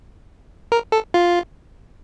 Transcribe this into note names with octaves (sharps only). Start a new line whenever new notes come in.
A#4
A4
F4